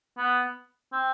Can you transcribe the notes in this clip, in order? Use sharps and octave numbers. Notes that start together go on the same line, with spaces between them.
B3
C4